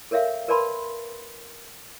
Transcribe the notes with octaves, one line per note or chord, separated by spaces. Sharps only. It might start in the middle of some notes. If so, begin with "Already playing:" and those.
A4 A#4 C#5 E5 F5
A#4 B4 D5 A5 B5 C6